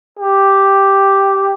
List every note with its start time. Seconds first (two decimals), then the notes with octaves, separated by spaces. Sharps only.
0.19 G4